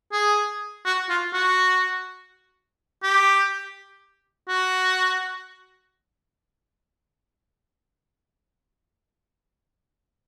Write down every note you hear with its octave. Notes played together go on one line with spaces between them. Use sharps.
G#4
F#4
F4
F#4
G4
F#4